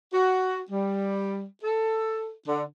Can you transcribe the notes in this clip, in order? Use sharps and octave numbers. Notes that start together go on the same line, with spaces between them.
F#4
G3
A4
D3